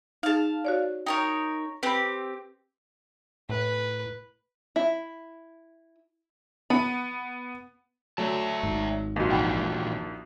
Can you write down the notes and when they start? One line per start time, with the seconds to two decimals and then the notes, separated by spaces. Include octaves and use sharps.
0.23 D#4 G#4 F5 A5
0.65 F#4 C#5 D5
1.06 D#4 A#4 C#5 G5
1.83 C4 G4 B4 B5
3.49 A2 B4
4.76 E4
6.70 B3 B5
8.18 F#3 A3 D5 E5 A5
8.63 G#1 G#2
9.16 A#1 D#2 F#4 D#5 F5
9.31 A#2 D#3 E3 F#5 G5 B5